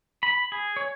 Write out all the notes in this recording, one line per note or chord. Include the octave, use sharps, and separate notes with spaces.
B5
G#4
C#5